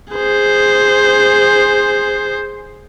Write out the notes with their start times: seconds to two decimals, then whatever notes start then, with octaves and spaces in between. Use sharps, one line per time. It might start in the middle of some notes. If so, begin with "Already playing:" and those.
0.14 G#4 C5